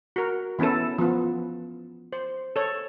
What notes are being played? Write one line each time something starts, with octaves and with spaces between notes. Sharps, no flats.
F#4 A#4
E3 B3 C#4 E4 A4
F3 B3
C5
A4 C#5